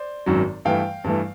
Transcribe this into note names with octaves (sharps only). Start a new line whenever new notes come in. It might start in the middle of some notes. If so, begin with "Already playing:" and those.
Already playing: C5 D5
G#1 F#2 D#3 F#3
G2 E3 A3 F5 G5
G2 E3 A3